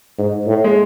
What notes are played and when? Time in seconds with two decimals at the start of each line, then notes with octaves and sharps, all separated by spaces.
0.19 G#2
0.47 A2
0.64 G#3